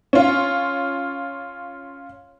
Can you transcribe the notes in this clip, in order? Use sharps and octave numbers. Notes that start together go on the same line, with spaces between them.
C#4 F4